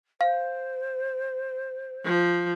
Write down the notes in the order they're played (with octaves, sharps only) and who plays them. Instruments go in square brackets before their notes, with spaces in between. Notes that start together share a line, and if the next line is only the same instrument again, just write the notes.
[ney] C5 [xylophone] F5
[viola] F3